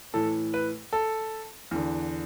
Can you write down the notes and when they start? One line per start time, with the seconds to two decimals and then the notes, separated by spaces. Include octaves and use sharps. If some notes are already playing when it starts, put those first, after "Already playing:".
0.14 A2 E3 A4
0.54 B4
0.93 A4
1.71 E2 D3